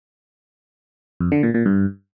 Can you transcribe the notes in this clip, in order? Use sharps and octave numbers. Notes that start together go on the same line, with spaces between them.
F2
D3
A#2
A#2
G2